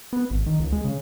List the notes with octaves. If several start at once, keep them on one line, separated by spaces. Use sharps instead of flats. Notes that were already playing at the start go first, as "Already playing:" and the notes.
B3
G#1
D#3
C#2
G#3
C#3